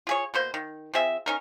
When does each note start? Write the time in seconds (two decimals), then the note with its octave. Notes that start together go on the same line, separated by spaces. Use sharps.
0.07 F4 G#4 C#5
0.34 B2 A#3 C5
0.54 D#3
0.94 F3 C4 G#4 E5
1.26 C#4 D#4 A#4